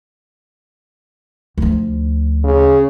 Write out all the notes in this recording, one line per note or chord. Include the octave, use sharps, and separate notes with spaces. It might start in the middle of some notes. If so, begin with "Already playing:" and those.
D2 F3
C#3